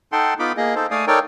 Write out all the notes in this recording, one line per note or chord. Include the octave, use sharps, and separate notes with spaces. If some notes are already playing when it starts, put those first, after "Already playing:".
D#4 A4 F#5 G5 A5 C6
B3 D#4 F4 B5 D6
A#3 G#4 D#5
D#4 A4 C5
A3 D5 F5 G#5 D#6
D#4 A4 A#4 C#5 D5 G5